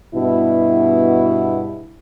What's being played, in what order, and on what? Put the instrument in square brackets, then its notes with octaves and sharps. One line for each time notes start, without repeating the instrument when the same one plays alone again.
[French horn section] G2 B2 E4